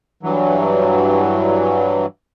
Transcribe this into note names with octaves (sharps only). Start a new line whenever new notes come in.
G2 E3 F#3